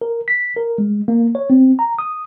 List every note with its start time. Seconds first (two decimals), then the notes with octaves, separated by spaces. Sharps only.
0.01 A#4
0.28 B6
0.56 A#4
0.78 G#3
1.08 A#3
1.35 C#5
1.50 C4
1.79 A#5
1.99 D#6